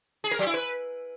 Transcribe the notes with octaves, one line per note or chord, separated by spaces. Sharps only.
G#4
A#4
F#3
E4
B4